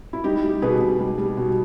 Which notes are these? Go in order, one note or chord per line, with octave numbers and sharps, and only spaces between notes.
E4
G3 D#4 G4
G3
B2 G#4 B4
B2
G3
G3
B2